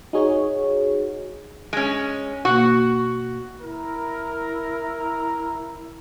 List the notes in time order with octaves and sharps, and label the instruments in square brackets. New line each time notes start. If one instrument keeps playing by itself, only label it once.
[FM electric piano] D#4 F#4 G#4 C#5
[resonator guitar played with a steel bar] G#3 C#4
[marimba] B2 A#3 [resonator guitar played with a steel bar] F#4
[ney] E4 [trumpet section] A#4